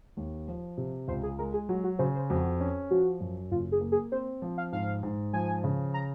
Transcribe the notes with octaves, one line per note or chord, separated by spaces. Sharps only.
D#2
F3
C3
C#2 C5
G#4
G#3 A#4
G#4
F#3 F#4
F#4
C#3 C5
C5
F2 F#4
C#4
F3 F#4
F#2
F#1 F4
G#4
A#3
G#4
C4 C5
F3
F5
G#2 F5
G#2
F3 G#5
C#3
A#5